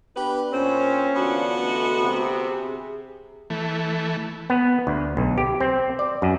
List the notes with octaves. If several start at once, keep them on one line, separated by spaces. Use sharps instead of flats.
B3 D4 G4 B4
A#2 C4 C#4 C5
D3 E3 B3 D4 F4 F#4
E3 G#3 A3
C3
G#4
E3 A3
B3
D2
B1
G4
C4
D5
F#2